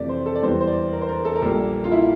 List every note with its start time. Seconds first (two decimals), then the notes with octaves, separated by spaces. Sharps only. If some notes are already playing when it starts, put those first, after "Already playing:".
Already playing: F2 C3 E3 A3 D5
0.09 C5
0.26 A4
0.35 D5
0.42 E2 E3 G3 C5
0.60 C5
0.67 D5
0.93 A#4
1.01 C5
1.09 A#4
1.25 A4
1.36 A#4
1.42 A#1 A#2 G3 A#3 A4
1.84 F4
1.92 E4